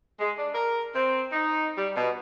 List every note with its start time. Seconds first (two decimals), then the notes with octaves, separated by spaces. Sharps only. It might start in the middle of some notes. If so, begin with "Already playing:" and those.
0.20 G#3
0.37 D4
0.55 A#4
0.94 C4
1.33 D#4
1.78 G3
1.96 B2